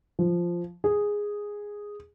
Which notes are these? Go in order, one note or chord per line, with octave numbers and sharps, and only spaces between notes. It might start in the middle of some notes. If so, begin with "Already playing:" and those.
F3
G#4